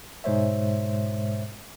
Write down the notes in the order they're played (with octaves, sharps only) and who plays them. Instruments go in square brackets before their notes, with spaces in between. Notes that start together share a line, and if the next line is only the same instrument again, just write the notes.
[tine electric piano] G#2 B2 G#3 C5 C#5 E5